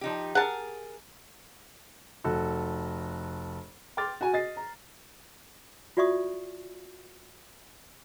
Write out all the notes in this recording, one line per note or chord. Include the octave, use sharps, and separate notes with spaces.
F3 D#4 G4
G#4 A#4 F#5 A5
F1 F#4 A4
G5 C6 D6 F6 A6
F#4 G#5
D#5 A6 C7
A#5
F4 F#4 D5 E5 C#6 D#6